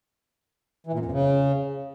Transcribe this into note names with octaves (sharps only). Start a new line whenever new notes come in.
E3
A#2
F#2
F2
C#3